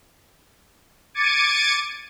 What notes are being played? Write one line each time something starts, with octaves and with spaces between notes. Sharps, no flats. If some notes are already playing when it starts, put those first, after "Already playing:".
D6 G#6 A6 C#7 D#7